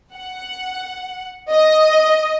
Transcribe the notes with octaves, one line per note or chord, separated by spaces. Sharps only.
F#5
D#5